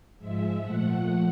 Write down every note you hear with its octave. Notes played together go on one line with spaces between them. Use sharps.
G#2 F3 G#3 E5
A#2 F3 A3 F#5